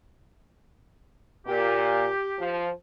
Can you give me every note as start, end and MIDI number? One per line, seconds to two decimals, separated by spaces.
1.47 2.08 46
1.47 2.56 67
2.39 2.69 53